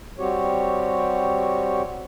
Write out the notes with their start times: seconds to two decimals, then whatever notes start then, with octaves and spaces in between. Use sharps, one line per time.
0.19 G3 C4 F#4 G4 C#5